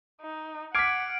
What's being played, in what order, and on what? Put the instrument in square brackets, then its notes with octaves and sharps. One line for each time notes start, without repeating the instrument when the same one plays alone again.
[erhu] D#4
[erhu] F#5 [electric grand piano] D6 F6 C7 [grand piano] G#6 B6 [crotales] D7